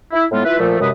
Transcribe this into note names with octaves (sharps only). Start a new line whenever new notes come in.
E4
A2 G#3 B3 F4
E4 F4 B4
A#2 F3 A3
F#2 C3 G#3 B4 D#6